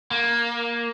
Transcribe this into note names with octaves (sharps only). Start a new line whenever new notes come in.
A#3